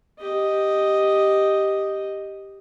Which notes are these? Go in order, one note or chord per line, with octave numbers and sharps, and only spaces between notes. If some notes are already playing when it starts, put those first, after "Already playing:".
G4 D#5